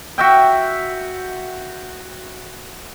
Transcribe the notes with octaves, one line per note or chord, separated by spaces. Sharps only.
F#4 E5 G5